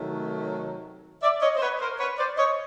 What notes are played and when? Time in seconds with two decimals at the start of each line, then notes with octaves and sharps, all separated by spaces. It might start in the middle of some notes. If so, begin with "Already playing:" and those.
Already playing: C3 D#3 F#3 A3
1.22 D5 E5
1.41 C#5 D#5
1.57 C5
1.61 B4 C#5
1.80 A#4 C5
1.99 B4 C#5
2.18 C5 D5
2.37 C#5 D#5